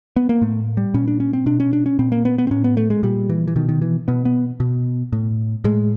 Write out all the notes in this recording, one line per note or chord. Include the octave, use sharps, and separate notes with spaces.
B3
A#3
A2 A3
G3
A#2 C#4
D4
C#4
C4
B2 D4
C#4
D4
C#4
A#2 C4
A#3
B3
B3
C4
A2 C#4
B3
A3
G#3
A#2 G3
E3
E3
B2 D#3
D#3
E3
B2 B3
B3
B2
A2
A2 G#3